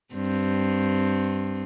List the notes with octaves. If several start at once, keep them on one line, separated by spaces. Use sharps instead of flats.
G2 C4